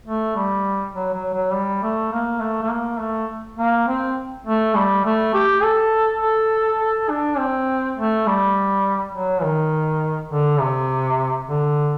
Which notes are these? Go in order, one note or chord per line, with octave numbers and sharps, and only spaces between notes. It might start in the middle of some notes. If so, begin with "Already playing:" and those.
A3
G3
F#3
F#3
F#3
G3
A3
A#3
A3
A3
A#3
A3
A#3
C4
A3
G3
A3
G4
A4
A4
A4
D4
C4
A3
G3
F#3
D#3
D3
C3
D3